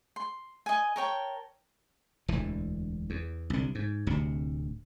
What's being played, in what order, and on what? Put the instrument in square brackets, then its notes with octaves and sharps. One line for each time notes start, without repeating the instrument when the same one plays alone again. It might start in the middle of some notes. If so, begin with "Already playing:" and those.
[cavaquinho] C6
D#5 G#5
A#4 C#5 G5 A5
[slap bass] E1 D2 E3
E2
C2 D3
G#2
D1 D2 C3